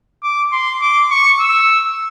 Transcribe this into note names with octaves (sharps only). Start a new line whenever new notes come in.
D6
C6
D6
C#6
E6